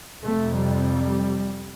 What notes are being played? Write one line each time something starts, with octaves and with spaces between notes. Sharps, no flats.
F2 C3 A3
G3